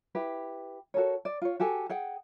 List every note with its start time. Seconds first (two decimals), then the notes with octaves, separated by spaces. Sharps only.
0.15 E4 G4 B4
0.94 F#4 A4 A#4 C#5
1.25 D5
1.42 F4 C#5
1.60 F#4 G4 A4 G#5
1.90 G#4 F#5 G5